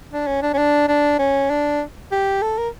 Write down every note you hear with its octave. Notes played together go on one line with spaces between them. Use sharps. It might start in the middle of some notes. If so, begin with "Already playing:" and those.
D4
C#4
D4
C#4
D4
D4
C#4
D4
G4
A4
A#4